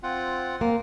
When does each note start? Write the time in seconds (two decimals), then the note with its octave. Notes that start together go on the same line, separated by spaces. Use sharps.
0.03 C4 F4 F#5
0.61 A#3